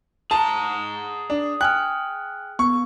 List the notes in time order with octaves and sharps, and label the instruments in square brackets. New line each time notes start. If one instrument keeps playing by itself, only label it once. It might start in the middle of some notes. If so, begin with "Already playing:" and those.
[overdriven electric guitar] G#4 A#5 [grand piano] A5
[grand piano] D4
[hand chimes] G5 G#5 F6 [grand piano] F#6
[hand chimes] B3 [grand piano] C#6